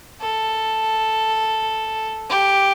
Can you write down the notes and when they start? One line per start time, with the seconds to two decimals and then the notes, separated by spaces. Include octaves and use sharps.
0.21 A4
2.30 G4